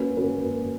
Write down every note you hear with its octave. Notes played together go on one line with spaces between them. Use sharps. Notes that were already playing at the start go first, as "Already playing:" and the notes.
Already playing: A#3 C#4 F#4 B4
A#3 C#4 F#4 B4